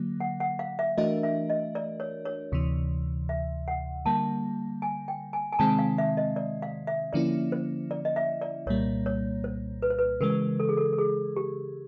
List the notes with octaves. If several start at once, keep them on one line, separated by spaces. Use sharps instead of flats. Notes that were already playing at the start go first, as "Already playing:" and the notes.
Already playing: D3 F#3 A#3
F#5
F#5
F5
E5
E3 A3 D4 F#4 A#4 D#5
E5
D#5
D5
C#5
C#5
D2 C3 E3
E5
F#5
D3 G3 A#3 A5
G#5
G5
G#5
G#5
C3 D#3 G#3 C4 A5
F5
E5
D#5
D5
F5
E5
D3 F3 A#3 C#4 E4 D5
C5
D5
D#5
E5
D5
C2 A#2 G3 A#3 C#5
C#5
C5
B4
C5
B4
C#3 E3 G#3 A#4
A4
G#4
A4
A4
G#4
G4